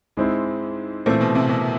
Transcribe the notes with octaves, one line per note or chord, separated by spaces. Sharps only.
G#2 G#3 C4 E4
A#2 E3 A3 C4
B2
C3
B2